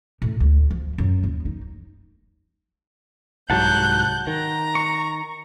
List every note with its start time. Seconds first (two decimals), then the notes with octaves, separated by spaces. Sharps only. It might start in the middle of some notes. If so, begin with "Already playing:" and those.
0.22 A2
0.40 D2
0.70 F3
0.98 F#2
1.23 D#2
1.45 D#4
3.50 C2 G#2 F#3 F#5 A5 F#6 G6
4.27 D#3 A#5
4.75 C#6